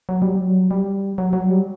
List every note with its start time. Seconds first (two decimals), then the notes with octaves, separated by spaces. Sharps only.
0.09 F#3
0.22 G3
0.36 F#3
0.71 G3
1.18 F#3
1.33 F#3
1.50 G3